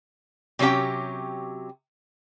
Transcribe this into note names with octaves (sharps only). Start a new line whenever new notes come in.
C3 F#3 C#4 G4 G5